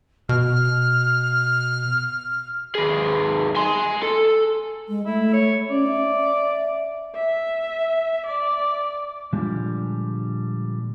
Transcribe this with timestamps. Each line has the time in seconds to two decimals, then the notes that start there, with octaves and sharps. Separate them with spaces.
0.29 B2 F6
2.75 D#2 G#4
3.56 G#5 C6
4.03 A4
4.89 G#3
5.06 A3 E4
5.33 C#5
5.70 C#4 D5
5.87 E5
7.15 E5
8.27 D5
9.33 A#2 D3 F3 G3 G#3